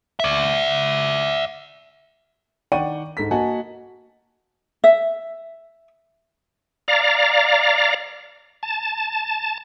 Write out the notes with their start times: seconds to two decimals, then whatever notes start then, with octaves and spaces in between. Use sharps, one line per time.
0.20 D5 E5
2.72 D#3 D5 F#5 G5 C#6 D#7
3.17 G#2 A4 B6
3.31 A#3 F#4 D#5 F#5 G#5 A5
4.84 E5
6.88 D5 F5 A#5
8.63 A5